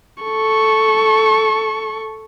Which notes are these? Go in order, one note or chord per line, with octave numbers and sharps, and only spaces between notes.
A4 C#6